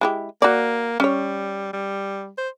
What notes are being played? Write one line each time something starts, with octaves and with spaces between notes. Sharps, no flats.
G#3 E4 G4
A#3 F#4 D5
G3 C#4 C#5
G3
C5